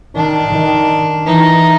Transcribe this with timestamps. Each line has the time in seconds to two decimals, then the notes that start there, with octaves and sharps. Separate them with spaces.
0.15 D#3 D4
0.52 D#3
1.26 E3 D#4